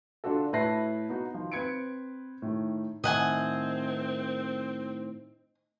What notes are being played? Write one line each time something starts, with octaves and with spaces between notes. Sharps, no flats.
D3 D4 F4 F#4 A4
A2 E4 B4 A5 A#6 C7
B3 D#4 F#4
D#3 F3
C4 B4 G#6 C#7 D7
A2 D#3
A2 D#3 C4 D#5 F#5 G#5